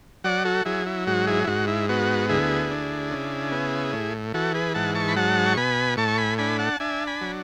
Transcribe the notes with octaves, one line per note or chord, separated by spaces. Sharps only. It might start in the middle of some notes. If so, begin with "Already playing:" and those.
F#3 D5 F#5
F#4 A4
F#3 E4 G#4
E4
G#2 F#4
E4 G#4
E4
G#2 F#4
E4
B3 F#4
D2 E4 G#4
D4
C#3
B3
A2
E3 F#4 A4
G#4 B4
G#2 F#5 A5
A5 C#6
B5
F#3 F#5 A5
C#6
B2 G#5 B5
A2 A5 C#6
C#6
G#5 B5
D4 G#5 B5
F#5 A5
D4 E5 G#5
G#5 B5
F#3